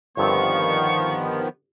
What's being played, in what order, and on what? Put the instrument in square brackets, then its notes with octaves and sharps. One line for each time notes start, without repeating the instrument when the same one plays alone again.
[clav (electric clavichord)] G1 G2 C4 [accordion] D#3 F3 B3 [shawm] C#6